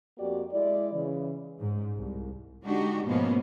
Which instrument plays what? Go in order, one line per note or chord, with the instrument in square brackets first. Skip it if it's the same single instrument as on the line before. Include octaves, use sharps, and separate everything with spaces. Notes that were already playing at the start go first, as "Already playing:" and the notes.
[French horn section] F2 A#3 F#4 G4 D5
G#3 E4 D5
C#3 E3
[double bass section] G#2
C2
[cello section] D3 G#3 D4 D#4 F#4 G4
G#2 B2 F3 A#3 B3 C#4